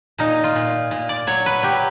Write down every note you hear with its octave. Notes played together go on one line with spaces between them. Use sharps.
A#2 D#4
F4
A#2
A#2
D5
F#3 C#5
B4
F#3 G4